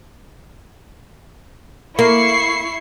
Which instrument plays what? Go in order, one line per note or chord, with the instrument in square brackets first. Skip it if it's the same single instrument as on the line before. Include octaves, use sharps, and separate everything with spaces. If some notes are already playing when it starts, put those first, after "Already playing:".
[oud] A#3 [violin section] E4 C#6 C7